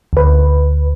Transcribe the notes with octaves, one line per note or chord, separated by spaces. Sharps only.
D2 B4